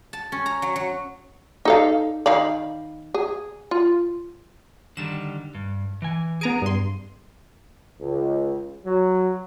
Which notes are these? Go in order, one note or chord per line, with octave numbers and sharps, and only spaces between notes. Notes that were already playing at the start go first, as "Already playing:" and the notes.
A5
C#4
A#5
F#3
F#3
D#4 A4 F5
D#3 F5 B5
G#4
F4
D3 D#3 G3 E7
G2
E3 G#5
B3 G#4 A#5 D7
G2 C6
C#2
F#3